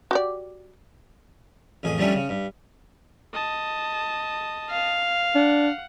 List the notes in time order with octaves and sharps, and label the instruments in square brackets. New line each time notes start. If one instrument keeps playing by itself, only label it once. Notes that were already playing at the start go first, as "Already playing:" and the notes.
[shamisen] F#4 G4 D5
[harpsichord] A1 F2 G#4
F3 G3 A3 C#4 D4
C#3
G2
[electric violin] D#5 A5
[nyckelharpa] F5
[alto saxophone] D4 [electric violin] F#5